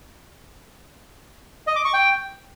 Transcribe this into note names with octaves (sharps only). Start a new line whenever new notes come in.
D#5
D6
C#6
G5